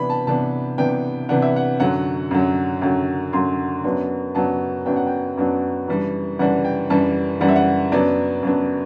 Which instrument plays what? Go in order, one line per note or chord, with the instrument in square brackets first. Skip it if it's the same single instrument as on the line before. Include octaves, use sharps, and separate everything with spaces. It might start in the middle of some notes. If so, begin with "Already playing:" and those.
Already playing: [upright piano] C3 E3 B3 D4 B5
A5
C3 E3 B3 D4 A5
C3 E3 B3 D4 G5
C3 E3 B3 D4 F#5
E5
F#5
F#2 D3 F#3 F#5
F#2 D3 F#3
F#2 D3 F#3 G5
F#2 D3 F#3 C6
F#2 F#3 B3 D4
F#2 F#3 B3 D4 A5
F#2 F#3 B3 D4 G5
F#5
G5
F#2 F#3 B3 D4
F#2 E3 G3 D4
F#2 E3 G3 D4 F#5
G5
F#2 E3 G3 D4 A5
F#2 E3 G3 D4 F#5
E5
F#5
F#2 F#3 B3 D4 D5
F#2 F#3 B3 D4